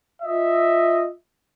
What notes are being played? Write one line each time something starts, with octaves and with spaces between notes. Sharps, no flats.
F4 D#5 E5